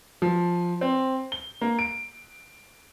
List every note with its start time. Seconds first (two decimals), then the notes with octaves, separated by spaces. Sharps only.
0.22 F3
0.81 C4
1.32 G7
1.61 A#3
1.79 D7